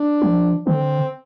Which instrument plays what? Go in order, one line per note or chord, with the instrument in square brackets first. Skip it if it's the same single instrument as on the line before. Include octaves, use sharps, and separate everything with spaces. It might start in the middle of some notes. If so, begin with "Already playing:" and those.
Already playing: [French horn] D4
[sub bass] F3
[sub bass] D3 [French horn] C4